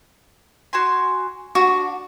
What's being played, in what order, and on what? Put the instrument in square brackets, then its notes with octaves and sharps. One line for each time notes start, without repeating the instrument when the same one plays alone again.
[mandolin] F#4 G#5 C6
[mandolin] D4 [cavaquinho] F#4